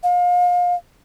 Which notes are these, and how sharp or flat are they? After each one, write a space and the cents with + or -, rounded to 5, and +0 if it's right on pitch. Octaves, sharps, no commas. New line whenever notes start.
F5 +30